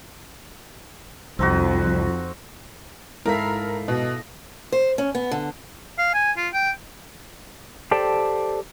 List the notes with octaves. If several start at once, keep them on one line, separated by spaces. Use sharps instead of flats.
C2 F2 C4 D#4 F#4
G#2 E4 A4 A#4 F5 A#5 B6
B2 D#5
C5
C#4
B3
D3
F5
G#5
F4
G5
G4 A4 C5 D5 G5 A5